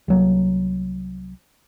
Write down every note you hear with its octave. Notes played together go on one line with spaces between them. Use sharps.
C2 F#3 A#3